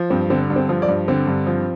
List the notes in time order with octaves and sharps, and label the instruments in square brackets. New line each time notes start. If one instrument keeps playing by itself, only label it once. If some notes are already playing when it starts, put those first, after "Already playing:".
Already playing: [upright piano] F3
[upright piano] G2 [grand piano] C4
[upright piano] D3 [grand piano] C4
[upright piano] G2 [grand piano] D4
[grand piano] C4
[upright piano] F3
[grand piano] D5
[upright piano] G2
[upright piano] D3 [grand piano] C4
[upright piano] G2
F3